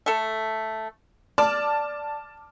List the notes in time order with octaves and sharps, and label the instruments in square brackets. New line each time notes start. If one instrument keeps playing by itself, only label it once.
[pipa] A3 A4
[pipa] D5 [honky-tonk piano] A5 D6 F6